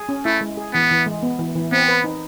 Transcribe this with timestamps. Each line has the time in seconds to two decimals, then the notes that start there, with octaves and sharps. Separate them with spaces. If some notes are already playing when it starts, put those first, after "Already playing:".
Already playing: G#4
0.09 C#4
0.25 A3 E4
0.41 G#3
0.57 G#4
0.74 E3 B3
0.91 E3
1.06 G#3
1.23 B3
1.39 E3
1.56 E3
1.72 B3 C4
1.88 B4
2.04 D#4